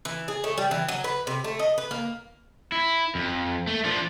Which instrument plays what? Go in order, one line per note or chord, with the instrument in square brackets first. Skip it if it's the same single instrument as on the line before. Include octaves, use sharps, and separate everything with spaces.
[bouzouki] E3
G#4
A3
G3
E3
F#3
B4
C3
A3
D#5
B4
A#3
[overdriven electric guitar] E4
F2
A3
F3 D4